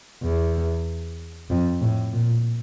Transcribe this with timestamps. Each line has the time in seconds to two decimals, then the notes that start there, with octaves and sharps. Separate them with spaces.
0.23 E2
1.50 F2
1.81 A2
2.13 A#2